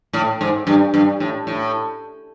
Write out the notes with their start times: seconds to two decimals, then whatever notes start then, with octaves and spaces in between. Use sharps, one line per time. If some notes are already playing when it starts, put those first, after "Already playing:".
0.13 A2
0.41 G#2
0.67 G2
0.94 G2
1.20 A2
1.47 A2